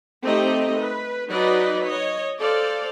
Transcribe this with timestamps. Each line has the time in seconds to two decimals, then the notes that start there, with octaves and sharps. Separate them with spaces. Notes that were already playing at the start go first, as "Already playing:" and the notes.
0.22 A3 C4 D#4 G4 D#5
0.77 B4
1.28 F#3 D#4 B4 D5 D#5
1.85 C#5 D#5
2.39 A4 C5 D5 F5